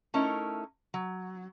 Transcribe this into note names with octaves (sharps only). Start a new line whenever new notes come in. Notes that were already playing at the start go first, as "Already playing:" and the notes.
A3 C#4 D#4 E4 A#4
F#3